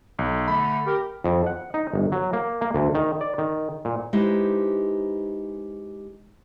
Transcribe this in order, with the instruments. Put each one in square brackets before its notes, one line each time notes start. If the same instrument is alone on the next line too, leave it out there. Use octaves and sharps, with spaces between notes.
[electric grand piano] B1
[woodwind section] D3 A3 [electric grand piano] B5
[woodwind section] G4 A#4
[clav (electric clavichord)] F2
F#5
D#4
G1
F#3
A#3
A#3
D2
D#3
D5
D#3
A#2
[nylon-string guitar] G#3 D#4 E4 G4 B4 C5